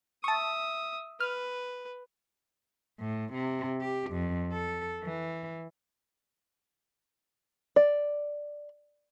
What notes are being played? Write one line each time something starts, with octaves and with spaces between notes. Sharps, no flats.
E5 A5 C#6 D#6
B4 F6
A2
C3
G4
F2
A4
E3
D5